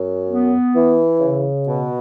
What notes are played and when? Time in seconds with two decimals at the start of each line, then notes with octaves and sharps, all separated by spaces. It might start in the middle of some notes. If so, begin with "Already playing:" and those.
Already playing: F#2
0.28 B3
0.75 E3
1.20 C#3
1.67 B2